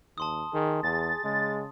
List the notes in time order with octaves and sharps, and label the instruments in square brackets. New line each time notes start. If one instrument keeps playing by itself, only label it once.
[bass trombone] D#2 [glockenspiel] A5 C6 D#6
[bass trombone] D#3 [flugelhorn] G#4
[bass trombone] E2 [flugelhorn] G#4 [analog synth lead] A6
[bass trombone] C#3 [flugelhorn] G#3